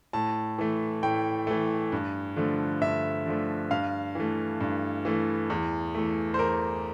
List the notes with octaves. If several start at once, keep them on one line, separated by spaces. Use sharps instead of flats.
A2 A5
E3 A3
A2 G5
E3 A3
G2
D3 F3 A3
G2 E5
D3 F3 A3
G2 F5
E3 A3
G2
E3 A3
E2
E3 A3
C5
E2 A#4